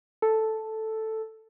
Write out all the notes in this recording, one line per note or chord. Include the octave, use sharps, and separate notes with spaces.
A4